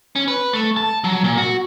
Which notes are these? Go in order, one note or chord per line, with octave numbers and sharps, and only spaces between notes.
C#4
B4
A3
A5
F#3
A#2
F#4